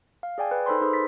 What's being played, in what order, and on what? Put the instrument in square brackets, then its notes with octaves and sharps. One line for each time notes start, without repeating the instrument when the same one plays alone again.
[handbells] F5
G#4 D5 G5 G#5
B4
D#4 A4 C5 B5 C6
D#4 G#4 B4 C5
A6 B6